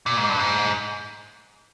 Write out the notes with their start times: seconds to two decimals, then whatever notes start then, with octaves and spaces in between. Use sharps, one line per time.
0.06 A#2
0.17 G#2
0.29 G2
0.40 G#2